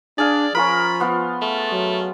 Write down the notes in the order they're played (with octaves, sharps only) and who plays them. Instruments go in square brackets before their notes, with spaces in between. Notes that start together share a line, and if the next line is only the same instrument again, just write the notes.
[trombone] D4 [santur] G#4 F5 [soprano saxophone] D5
[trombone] F3 [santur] C#4 F4 A#4 [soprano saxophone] B5
[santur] B3 F4
[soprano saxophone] A3
[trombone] F#3